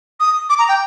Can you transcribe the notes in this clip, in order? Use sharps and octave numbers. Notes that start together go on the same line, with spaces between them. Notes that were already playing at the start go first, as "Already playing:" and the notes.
D#6
D6
A#5
G5